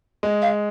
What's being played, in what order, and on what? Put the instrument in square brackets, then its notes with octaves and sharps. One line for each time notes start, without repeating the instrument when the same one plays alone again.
[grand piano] G#3
[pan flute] F5